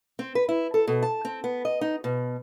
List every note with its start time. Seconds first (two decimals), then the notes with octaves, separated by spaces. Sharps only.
0.19 C4
0.35 B4
0.49 E4
0.74 A4
0.88 B2
1.03 A5
1.25 C4
1.44 B3
1.65 D#5
1.81 D#4
2.04 B2